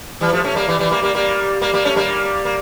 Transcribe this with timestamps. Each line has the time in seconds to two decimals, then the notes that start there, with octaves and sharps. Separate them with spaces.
0.21 E3 G3
0.33 F3 A3
0.44 A3 C#4
0.56 G3 A#3
0.68 E3 G3
0.79 E3 G3
0.91 G3 A#3
1.02 G3 A#3
1.15 G3 A#3
1.62 G3 A#3
1.73 G3 A#3
1.85 A3 C#4
1.96 G3 A#3
2.45 A#3